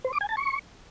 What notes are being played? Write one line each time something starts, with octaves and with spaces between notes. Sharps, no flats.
C5
D6
G#5
A5
C#6